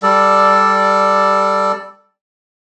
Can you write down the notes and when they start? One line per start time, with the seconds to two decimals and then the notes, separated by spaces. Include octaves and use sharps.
0.03 G3 A4 D5